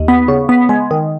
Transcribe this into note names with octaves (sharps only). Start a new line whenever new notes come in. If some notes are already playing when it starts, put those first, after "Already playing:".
Already playing: D#2
B3
C#3
B3
G#3
D#3